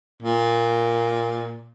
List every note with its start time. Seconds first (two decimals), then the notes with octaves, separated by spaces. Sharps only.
0.23 A#2